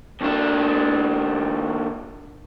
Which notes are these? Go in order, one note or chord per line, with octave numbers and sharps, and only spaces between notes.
D#2 D4